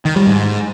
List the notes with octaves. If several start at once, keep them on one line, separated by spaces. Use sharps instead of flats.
D#3
G3
G#2